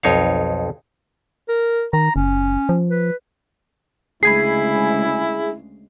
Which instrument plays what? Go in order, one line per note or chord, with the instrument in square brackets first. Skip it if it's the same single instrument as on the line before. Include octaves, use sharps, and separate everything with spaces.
[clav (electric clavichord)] B1 F2 D#4 C#5 F5
[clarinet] A#4
[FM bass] D#3 [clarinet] A#5
[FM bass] F#1 [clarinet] C#4
[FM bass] F3
[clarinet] B4
[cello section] D2 C#3 G#3 [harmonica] E4 [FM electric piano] G#4 G#5 B5 [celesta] C7